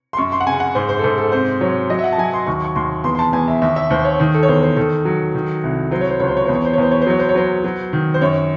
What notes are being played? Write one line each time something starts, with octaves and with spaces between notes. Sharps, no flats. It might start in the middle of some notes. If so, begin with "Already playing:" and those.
C6
F#2 C#6
C6
F#5
C#3 G#5
F#5
G#2 C5
C5
A4
G#2 C5
A4
C3 C5
F#3 C#5
F#3 D#5
E5
F#5
A5
F#3 G#5
C6
D#2 C#6
C#6
D#2 C6
E2 C6
C6
A5
E2 G#5
E5
D#2 E5
E5
D#2 C5
C#5
D#3
A4
C#5
E2 C5
C5
D#3 A4
F#3
D#3
C2
F#3 C5
C#5
C5
C#2 C#5
C5
C#5
E2 C5
C#5
C5
C#5
E2 C5
C#5
C5
F#3 C#5
C5
C#5
F#3 C5
F#3
D#3
C5
F#2 C#5